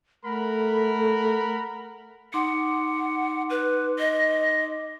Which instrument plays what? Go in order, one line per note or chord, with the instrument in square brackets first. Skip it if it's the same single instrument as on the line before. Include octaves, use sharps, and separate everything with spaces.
[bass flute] A3 [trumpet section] A#4 F#5 B5
[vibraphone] D#4 C6 D6 [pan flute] F#5
[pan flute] B4
D#5